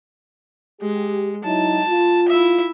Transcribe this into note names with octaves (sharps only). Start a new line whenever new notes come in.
G#3 G4
F#3 D#4 E4 A5
F4
E4 E5